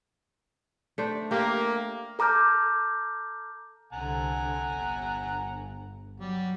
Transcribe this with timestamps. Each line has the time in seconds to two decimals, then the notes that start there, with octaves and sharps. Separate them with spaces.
0.98 A3 D4 C5
1.31 A#3 G4
2.19 A4 A#5 D6 F6 G6
3.93 C2 D3 F#5 G#5 A#5
4.70 G1
6.20 F#3 G3